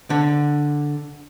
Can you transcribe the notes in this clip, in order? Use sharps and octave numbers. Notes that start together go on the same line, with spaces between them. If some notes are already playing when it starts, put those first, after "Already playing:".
D3